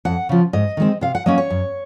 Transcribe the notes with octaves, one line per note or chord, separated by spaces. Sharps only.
F2 F#5
C#3 F3
G#2 D#5
D#3 G#3 C4
C3 F5
F#5
F#3 A#3 C#4 D#5
C#5
F#2